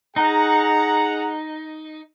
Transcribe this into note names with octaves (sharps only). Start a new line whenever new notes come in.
D#4 G#4 F#5 A#5